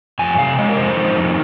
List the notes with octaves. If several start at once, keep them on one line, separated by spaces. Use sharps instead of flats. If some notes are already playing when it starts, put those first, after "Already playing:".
F2 G#5
C3 F5
G#3 D#5
A#4
F2 C5
D#3
F2